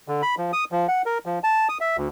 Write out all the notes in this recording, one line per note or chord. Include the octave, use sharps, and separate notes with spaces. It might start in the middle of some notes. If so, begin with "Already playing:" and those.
D3
B5
F3
D#6
F3
F#5
A#4
F3
A5
D#6
E5
D2